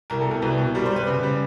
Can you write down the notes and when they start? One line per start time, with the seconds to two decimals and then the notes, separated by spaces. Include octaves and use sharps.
0.10 C2 A#4
0.21 A4
0.26 B2 A#4
0.42 C2 B4
0.58 B2
0.74 G3 A#4
0.85 C5
0.91 G3
0.96 B4
1.07 C#3
1.23 G3